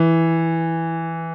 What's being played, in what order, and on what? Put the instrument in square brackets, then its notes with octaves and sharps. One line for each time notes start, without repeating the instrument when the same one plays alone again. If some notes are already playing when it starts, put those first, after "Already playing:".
Already playing: [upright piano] E3